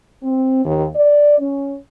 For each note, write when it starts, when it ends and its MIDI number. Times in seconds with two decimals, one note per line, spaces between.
0.23 0.61 60
0.65 0.86 39
0.96 1.39 74
1.39 1.75 61